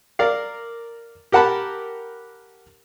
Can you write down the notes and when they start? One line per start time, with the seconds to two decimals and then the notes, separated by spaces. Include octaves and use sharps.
0.19 A#4 D5 F5
1.32 G4 A#4 F#5 A5 B5